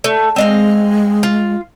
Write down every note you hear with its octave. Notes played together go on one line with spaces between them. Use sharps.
A3
G#3 C4 D#5 F5
F4